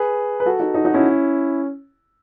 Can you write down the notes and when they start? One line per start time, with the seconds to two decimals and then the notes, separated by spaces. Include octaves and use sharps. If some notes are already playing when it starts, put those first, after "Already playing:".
Already playing: G#4 B4
0.40 B4
0.46 F#4 A4
0.60 D#4 F#4
0.74 D#4 F#4
0.85 D#4 F#4
0.94 C#4 E4